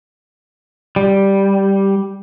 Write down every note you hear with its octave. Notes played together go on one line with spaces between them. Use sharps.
G3